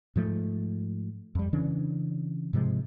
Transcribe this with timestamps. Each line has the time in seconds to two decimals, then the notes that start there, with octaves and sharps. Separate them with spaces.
0.16 G#2 F3 A3
1.35 F2 G3
1.53 C#3 E3 C#4 D4
2.53 G#2 C3 F3 G#3